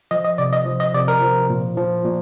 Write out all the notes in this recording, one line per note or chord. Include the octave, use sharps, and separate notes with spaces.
F3 D#5
D#5
C3 D5
D#5
F3
D#5
C3 D5
A#4
F3
A#2
F3
A#2